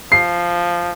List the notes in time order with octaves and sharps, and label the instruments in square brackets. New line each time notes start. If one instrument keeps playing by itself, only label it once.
[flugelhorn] F3 [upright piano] C7